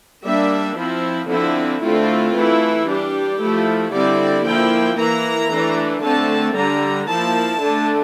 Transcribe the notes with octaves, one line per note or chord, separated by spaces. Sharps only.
G3 A#3 D4 E5
F3 C4 E4
D3 F3 C4 E4
D3 A3 C4 E4 F4
E3 A3 E4
G3 D4 G4
F3 A3 E4
D3 G3 C4 E4 D5
F3 A#3 E4 G5
E3 A#3 E4 A#5
E3 A3 D4
D3 A3 C4 A5
D3 G3 D4 A#5
F3 A#3 E4 A5
D3 A3 D4